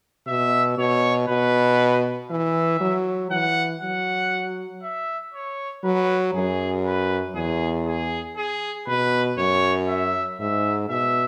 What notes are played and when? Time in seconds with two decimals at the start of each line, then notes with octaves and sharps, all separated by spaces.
0.27 B2 E5
0.78 B2 C#5
1.28 B2 B4
2.30 E3 E5
2.80 F#3
3.31 E3 F#5
3.81 F#3 F#5
4.83 E5
5.34 C#5
5.84 F#3 B4
6.34 F#2 G#4
6.86 B4
7.35 E2 G#4
7.86 G#4
8.37 G#4
8.87 B2 B4
9.37 F#2 C#5
9.88 E5
10.39 G#2 E5
10.89 B2 E5